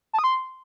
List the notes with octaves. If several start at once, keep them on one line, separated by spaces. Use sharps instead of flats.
A5
D#6
C6